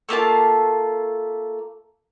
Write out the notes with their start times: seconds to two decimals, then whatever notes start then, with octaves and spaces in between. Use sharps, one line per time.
0.09 A3 A#3 F4 A5